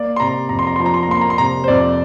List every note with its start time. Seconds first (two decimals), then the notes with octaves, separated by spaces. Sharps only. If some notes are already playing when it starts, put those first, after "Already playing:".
Already playing: A#3 D5
0.16 C6
0.20 C3 A#5
0.49 F2 A#5
0.59 C6
0.67 A#5
0.76 C6
0.80 F3
0.86 A#5
0.94 C6
1.03 A#5
1.09 A#3 C6
1.21 A#5
1.30 C6
1.38 C3 A#5
1.64 C5
1.68 F2 D5